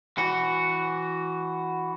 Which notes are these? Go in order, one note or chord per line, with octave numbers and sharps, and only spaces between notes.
E3 F#4